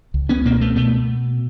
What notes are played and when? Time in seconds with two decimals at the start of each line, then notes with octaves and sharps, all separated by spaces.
0.14 C#2
0.29 B3 C#4
0.45 B2 A#3 C4
0.61 A3 B3
0.76 B2 A3 B3